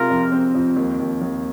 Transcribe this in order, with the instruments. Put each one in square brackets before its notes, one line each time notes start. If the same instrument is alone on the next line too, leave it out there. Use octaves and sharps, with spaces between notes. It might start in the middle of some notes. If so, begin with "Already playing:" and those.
Already playing: [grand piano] C3 G#3 C4 [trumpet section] F4 A#4
[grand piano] F2
C4
F2
D#2
D#2
D#2